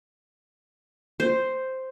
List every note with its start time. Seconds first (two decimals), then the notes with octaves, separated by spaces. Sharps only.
1.20 C5